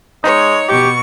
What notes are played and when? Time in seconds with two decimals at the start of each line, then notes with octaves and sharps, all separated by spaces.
0.24 G#3 D#4 C#5
0.69 B2 G4 C#6